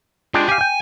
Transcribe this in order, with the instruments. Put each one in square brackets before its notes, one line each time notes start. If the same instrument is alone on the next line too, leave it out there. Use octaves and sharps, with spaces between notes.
[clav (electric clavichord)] G#3 D4 G5 [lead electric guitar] F4 G4
[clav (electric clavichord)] G4 F5 [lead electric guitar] G#5
[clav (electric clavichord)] G5